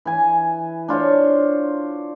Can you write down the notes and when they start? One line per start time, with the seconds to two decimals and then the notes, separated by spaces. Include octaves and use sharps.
0.05 E3 G#5
0.88 D4 F4 C5 C#5